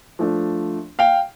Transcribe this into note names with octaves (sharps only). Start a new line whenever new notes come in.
F3 A3 D4
F5 G5